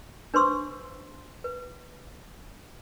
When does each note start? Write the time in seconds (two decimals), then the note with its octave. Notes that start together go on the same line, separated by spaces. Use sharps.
0.34 D4 B4 C5 C6 C#6 E6
1.44 B4